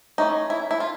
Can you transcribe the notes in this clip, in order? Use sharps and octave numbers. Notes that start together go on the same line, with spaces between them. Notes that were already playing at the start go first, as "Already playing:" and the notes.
E3 A3 C#4 D#4
E4
E4
F4